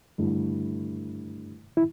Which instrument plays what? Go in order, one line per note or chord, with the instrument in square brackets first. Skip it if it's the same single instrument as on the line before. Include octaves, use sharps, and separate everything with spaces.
[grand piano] G2 D3 A3 E4
[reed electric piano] E4